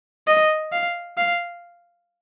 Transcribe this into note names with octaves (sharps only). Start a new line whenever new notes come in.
D#5
F5
F5